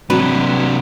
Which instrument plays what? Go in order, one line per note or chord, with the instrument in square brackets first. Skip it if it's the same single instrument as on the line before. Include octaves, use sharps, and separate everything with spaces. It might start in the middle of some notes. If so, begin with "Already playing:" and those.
[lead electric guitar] C3 D4 [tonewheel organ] E3 A#3 C4 [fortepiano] F#3 [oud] B4